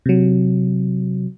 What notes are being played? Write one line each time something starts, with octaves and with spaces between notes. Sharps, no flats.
C3 F#3